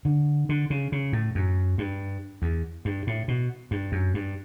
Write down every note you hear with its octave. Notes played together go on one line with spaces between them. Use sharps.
D3
D3
C#3
C#3
A2
F#2
G2
E2
G2
A2
B2
G2
F#2
G2